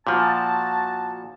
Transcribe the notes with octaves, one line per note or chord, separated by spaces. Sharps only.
A#2 F3 F#4 A5